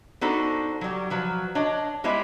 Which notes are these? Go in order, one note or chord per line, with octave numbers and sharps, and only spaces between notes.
B3 D4 D#4 F#4 A4 C5
F#3 G3
F3 F#3 B4
D4 C#5 D#5
G3 G#3 B3 E4 C5 E5